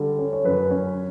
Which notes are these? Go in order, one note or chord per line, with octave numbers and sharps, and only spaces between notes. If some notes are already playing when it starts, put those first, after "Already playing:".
Already playing: D3 G3
C#4
C#5
F#2 B4
C#4 C#5